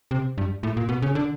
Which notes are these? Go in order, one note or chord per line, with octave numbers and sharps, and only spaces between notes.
C3
G2
A2
A#2
B2
C#3
D3